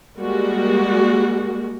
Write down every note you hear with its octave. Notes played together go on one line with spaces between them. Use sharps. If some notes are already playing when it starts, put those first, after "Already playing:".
G3 G#3 A#3 F#4